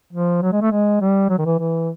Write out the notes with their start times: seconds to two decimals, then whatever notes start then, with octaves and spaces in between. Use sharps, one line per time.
0.13 F3
0.42 F#3
0.53 G#3
0.62 A3
0.72 G#3
1.01 G3
1.30 F#3
1.39 D#3
1.45 E3
1.59 E3